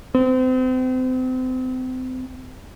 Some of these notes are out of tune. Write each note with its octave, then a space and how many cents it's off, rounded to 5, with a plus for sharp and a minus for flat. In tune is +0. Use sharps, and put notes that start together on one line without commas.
C4 -35